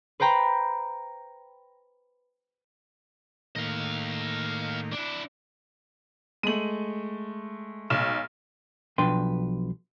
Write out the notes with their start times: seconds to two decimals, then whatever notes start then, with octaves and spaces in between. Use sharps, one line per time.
0.20 B4 C5 G5 A#5 B5
3.56 A2 D#3 A#3 D#5 F5
4.92 D4 E4
6.43 G#3 A3 D#7 F#7
7.90 B1 F6 E7
8.98 B1 F3 D4 B4 G5 C6